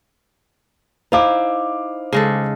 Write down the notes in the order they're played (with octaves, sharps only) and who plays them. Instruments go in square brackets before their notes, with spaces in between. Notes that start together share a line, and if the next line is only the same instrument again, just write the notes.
[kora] D#4 E4 [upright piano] C5 F5 D6
[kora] C#3 G#3 A4